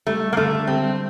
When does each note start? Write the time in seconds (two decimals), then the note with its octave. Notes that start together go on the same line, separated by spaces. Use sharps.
0.07 G3 A3
0.33 A#3
0.37 D3 A3
0.67 G3 C4